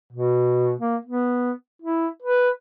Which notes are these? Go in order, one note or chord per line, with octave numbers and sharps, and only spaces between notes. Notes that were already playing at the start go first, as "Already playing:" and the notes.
B2
A#3
B3
E4
B4